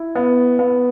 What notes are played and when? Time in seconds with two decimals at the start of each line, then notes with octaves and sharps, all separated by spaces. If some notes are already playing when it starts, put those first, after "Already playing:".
Already playing: E4
0.15 B3
0.59 B3